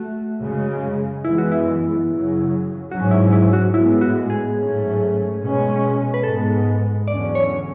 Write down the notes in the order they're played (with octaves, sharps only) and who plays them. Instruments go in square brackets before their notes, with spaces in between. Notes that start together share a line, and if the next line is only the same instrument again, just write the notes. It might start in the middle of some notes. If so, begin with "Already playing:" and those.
Already playing: [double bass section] A3 [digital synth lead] F#4
[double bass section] F#2 C#3 G#3
[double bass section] F#2 E3 G#3 B3 [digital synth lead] E4
[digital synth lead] F#4
E4
[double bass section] F#2 C#3 F#3
[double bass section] G#2 F#3 C#4 [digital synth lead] F#4
[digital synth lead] E4
E4
F#4
[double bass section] A2 G#3 B3 [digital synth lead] E4
[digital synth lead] F#4
G#4
[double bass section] G#2 F#3 A3 C#4
B2 G#3 C#4
[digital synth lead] B4
[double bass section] G#2 G#3 B3 [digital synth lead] A4
[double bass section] E2 D3 F#3 C#4 [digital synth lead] D5
[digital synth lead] C#5